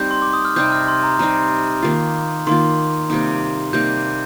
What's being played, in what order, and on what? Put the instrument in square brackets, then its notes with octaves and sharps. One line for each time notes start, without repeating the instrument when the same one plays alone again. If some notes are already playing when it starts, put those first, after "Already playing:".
Already playing: [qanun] G3 C4 D#4 [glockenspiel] G6
[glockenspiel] C6
D6
D#6
F6
[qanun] C3 G3 C4 D#4 [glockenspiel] G6
[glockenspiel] F6
C6
A#5
[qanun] C3 G3 C4 D#4 [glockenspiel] A#5
[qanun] D#3 A#3 F4
[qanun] D#3 A#3 F4 [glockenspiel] C6
[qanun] C3 G3 A#3 D#4
[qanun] C3 G3 A#3 D#4 [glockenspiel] G6